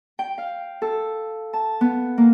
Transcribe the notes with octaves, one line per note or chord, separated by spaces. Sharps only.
G5
F5
A4
A5
B3
A#3